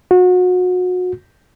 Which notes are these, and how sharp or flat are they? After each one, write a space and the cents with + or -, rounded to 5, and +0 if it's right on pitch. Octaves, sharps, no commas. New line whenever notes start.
F#4 -30